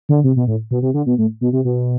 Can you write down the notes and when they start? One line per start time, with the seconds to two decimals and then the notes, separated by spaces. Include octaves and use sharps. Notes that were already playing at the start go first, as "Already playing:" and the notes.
0.09 D3
0.24 C3
0.36 B2
0.48 A2
0.71 B2
0.82 C3
0.94 D3
1.06 B2
1.18 A2
1.41 B2
1.53 C3
1.65 B2